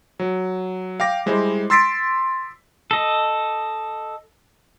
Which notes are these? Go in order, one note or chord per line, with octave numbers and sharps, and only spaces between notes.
F#3
F5 G5 D6 A#6
G3 G#3 E4 C5
C6 E6 A6 B6 C7 D7
A4 D#5